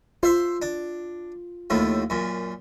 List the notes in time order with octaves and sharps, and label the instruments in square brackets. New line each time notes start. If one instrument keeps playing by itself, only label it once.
[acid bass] F4 [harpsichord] C5 E5 C6
[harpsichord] D4
D#2 A2 F3
F#2 A#2